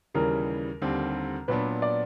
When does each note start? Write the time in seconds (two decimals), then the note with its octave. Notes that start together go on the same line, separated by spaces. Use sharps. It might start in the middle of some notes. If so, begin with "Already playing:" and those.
0.14 D#2 C#3 E3 G3 A#4
0.82 D#2 D3 G3 C4
1.48 A#2 F#3 B3 D4 B4
1.82 D5